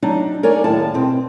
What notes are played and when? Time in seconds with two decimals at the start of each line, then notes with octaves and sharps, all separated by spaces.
0.03 F#3 D4 D#4
0.43 A#4 C#5 D5 G#5
0.64 D#2 A2 A5
0.94 B2 C4